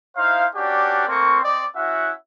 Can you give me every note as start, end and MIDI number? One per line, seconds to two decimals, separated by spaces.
0.17 0.45 63
0.17 0.45 64
0.17 0.45 72
0.17 0.45 77
0.55 1.06 61
0.55 1.06 62
0.55 1.06 66
0.55 1.06 67
0.55 1.06 71
0.55 1.06 74
1.07 1.37 57
1.07 1.37 58
1.07 1.37 60
1.07 1.37 84
1.07 1.37 85
1.43 1.65 60
1.43 1.65 74
1.43 1.65 75
1.75 2.12 61
1.75 2.12 64
1.75 2.12 66
1.75 2.12 76
1.75 2.12 78